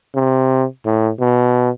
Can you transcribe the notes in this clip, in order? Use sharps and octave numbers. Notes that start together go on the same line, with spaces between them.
C3
A2
B2